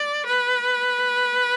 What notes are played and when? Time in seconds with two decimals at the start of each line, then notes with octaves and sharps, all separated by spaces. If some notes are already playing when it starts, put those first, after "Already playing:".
Already playing: D5
0.26 B4